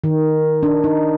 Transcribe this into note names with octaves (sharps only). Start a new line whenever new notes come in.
D#3
D4
D#4